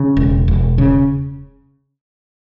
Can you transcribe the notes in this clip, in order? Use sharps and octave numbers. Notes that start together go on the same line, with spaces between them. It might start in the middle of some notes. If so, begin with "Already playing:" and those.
Already playing: C#3
E1
E1
C#3